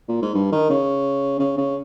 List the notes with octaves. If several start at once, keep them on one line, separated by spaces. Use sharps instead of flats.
A#2
G#2
G2
D#3
C#3
C#3
C#3